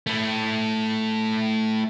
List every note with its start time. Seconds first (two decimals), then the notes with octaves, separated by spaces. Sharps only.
0.07 A3 E4